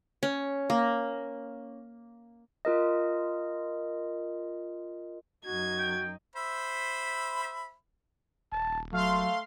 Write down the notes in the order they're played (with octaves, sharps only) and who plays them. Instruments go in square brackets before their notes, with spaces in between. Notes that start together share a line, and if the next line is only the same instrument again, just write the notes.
[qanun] C#4
A#3
[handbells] F4 A#4 D#5
[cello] F#2 D#4 [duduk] F#4 [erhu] G#6
[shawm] G5
[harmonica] C5 E5 B5
[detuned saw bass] D#1 [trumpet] A5
[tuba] F#3 [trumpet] A3 [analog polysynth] F5 C6